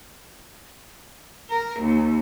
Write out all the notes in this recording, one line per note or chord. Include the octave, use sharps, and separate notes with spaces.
A#4
D#2